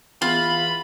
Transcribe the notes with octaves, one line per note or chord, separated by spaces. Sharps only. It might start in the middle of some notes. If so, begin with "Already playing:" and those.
E2 F4 B5